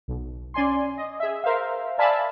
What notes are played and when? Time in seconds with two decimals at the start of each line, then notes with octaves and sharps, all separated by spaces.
0.08 B1
0.54 C#4 D5 G#5 C6
0.98 D#5
1.20 G#4 E5
1.44 A#4 C5 E5 F5
1.98 D5 E5 F5 G#5 A5 B5